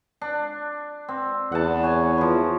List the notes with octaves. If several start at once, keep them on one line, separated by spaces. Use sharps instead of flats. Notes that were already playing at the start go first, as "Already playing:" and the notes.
D4
C4
E2 F#5 A5
C#5 G#5
E3 F3